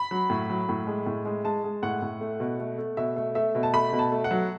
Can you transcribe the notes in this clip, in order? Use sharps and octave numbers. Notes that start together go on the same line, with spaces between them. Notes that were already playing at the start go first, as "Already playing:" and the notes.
Already playing: B5
F#3
A2
F#3
A2
G#3
A2
G#3
G#3 A5
G#3
A2 F#5
A2
A3
B2
A3
A3
B2 E5
A3
A3 E5
B2
A5
A3 B5
B2
A5
A3
F#5
F#3